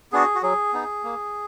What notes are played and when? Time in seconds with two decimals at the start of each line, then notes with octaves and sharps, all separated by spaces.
0.12 B3 D4 F#4 G#4
0.35 F#4
0.43 F#3 G#4
0.73 B3 D#4
1.04 A#3